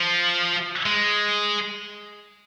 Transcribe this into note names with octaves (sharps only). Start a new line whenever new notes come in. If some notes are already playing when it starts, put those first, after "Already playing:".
Already playing: F3
G#3